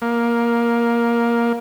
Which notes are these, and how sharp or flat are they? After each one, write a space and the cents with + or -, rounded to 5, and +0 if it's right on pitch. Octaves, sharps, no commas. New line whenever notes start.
A#3 +10